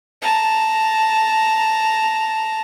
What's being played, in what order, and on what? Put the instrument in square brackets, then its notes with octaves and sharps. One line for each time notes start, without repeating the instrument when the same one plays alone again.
[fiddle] A5 A#5